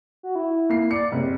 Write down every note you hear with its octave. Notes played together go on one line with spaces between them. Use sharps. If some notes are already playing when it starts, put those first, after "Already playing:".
F#4
E4
A#3 C7
D5 C#7
F#1 C3